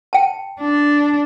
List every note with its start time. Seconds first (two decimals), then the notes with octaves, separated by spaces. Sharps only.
0.13 G5 A5
0.60 D4